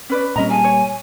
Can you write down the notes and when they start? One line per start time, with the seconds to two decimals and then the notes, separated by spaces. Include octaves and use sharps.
0.10 C#4 B4 D5
0.36 A#2 G3 C#4 D#5 A#5
0.50 F4 G#4 G#5 A5
0.64 C#5